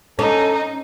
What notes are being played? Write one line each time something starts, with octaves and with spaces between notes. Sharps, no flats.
C#4 D#4 A4